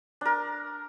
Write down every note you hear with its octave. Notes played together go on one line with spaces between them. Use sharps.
D4 A#4